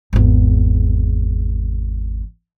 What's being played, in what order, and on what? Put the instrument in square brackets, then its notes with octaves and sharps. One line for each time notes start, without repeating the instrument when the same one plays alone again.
[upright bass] G#1 E2